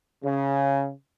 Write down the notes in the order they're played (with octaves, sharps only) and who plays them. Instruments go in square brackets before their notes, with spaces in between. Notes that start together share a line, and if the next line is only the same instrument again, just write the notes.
[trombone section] C#3